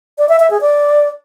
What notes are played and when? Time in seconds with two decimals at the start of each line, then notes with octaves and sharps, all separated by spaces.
0.18 D5
0.29 E5
0.40 E5
0.51 G#4
0.61 D5